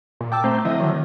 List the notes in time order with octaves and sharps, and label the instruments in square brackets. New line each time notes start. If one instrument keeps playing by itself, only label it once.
[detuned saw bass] A#2
[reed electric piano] G5 A5 E6 [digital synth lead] D6
[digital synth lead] A3 [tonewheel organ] C4 C5 [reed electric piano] A#5
[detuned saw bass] D3 [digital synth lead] F3 [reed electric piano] E4 E5 [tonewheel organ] D#5
[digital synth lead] D#3 [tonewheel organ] F#3